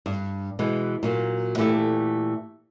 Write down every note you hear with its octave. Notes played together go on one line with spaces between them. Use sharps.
G2
B2 E3 G#3
A#2 F#3 A#3
A#2 E3 A3 F#4 G4 A4